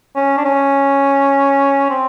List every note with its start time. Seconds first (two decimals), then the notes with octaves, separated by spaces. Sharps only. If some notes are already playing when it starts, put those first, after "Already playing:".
0.16 C#4
0.38 D4
0.45 C#4
1.90 C4